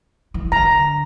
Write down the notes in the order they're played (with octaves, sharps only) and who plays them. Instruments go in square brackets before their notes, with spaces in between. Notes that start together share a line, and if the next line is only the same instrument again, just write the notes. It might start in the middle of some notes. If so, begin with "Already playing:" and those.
[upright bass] E3
[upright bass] D3 [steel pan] A#5